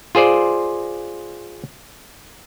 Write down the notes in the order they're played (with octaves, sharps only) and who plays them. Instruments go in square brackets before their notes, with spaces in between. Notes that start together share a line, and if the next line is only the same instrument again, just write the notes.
[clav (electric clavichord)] F4 G#4 C5 D5